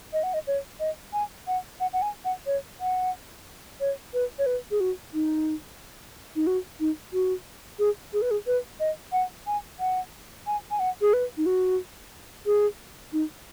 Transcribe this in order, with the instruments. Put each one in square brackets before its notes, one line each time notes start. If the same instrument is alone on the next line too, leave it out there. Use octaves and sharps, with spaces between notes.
[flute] D#5
F#5
D#5
C#5
D#5
G#5
F#5
F#5
F#5
G#5
F#5
C#5
F#5
C#5
B4
C#5
B4
G#4
F#4
D#4
D#4
F#4
D#4
F#4
G#4
G#4
B4
G#4
B4
D#5
F#5
G#5
F#5
G#5
G#5
F#5
G#4
B4
D#4
F#4
G#4
D#4